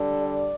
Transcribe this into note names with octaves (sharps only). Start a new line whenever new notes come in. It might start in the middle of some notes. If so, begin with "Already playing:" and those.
Already playing: D3 G3
D5